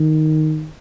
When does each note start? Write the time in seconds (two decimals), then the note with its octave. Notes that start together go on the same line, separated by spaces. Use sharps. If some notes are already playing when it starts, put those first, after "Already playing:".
Already playing: D#3